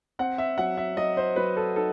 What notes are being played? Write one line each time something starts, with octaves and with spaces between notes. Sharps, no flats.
C4 F#5
E5
F#3 F#5
E5
F#3 D#5
C5
F#3 B4
A4
D#4 A4